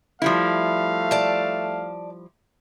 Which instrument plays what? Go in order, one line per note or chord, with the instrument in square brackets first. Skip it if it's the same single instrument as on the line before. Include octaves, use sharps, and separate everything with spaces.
[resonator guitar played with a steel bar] F3 G3 E4 [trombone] A3 [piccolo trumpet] F5
[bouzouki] D5 A5